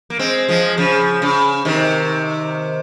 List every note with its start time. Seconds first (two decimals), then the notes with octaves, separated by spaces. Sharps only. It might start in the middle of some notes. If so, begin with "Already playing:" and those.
0.10 A#3
0.19 G#3 C4
0.48 F3 G#3
0.77 C#3 F3
1.22 C#3
1.65 C3 D#3